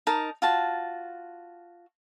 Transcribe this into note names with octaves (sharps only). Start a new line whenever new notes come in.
D#4 A#4 A5
F4 F#4 A5